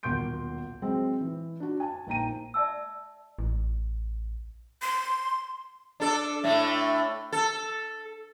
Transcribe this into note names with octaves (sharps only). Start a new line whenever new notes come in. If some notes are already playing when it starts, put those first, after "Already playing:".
D#1 B1 A#3 C6 G6 D7
F#3 G#3 C4
E3
D4 F#4
G#5 A5
A#1 D#4 G5 A#5 D#7
D5 E5 A5 E6
A1
C6
D4 A4 D5
A2 A3 D4
A4